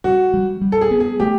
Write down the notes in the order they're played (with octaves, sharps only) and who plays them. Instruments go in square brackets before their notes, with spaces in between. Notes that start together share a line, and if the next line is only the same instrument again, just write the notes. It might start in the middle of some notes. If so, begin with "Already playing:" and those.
[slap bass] G3 [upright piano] F#4
[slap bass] G3
G3
[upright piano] A4
G#4
[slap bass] B3
[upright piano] G#4
[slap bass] A3 [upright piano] G4